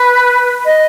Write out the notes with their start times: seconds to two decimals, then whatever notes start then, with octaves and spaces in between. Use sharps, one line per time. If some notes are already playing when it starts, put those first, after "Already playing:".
Already playing: B4
0.65 D#5